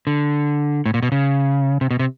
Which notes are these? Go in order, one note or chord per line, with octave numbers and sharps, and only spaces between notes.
D3
A2
A#2
B2
C#3
C3
B2
C3